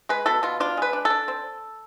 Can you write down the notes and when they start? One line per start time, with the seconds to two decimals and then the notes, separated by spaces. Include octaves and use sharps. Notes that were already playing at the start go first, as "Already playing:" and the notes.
0.09 G#3 B4
0.26 B2 A4
0.43 B2 F4
0.60 D4 F4
0.77 G#3 B4
0.93 D4
1.05 A4
1.10 D4
1.28 C4